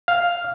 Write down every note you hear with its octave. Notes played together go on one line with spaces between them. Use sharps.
F5